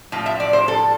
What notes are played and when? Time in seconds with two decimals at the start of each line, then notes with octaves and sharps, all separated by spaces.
0.12 A2 F3
0.26 E5
0.40 D5
0.53 C5
0.68 A4